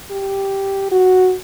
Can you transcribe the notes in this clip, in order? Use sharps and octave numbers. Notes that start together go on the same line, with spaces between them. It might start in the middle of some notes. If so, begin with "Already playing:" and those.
G4
F#4